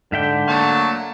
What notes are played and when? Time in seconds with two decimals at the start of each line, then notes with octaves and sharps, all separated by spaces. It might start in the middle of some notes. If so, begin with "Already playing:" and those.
0.12 G#2 D3 E5 G5
0.48 F#3 A3 A#3 A5 C#6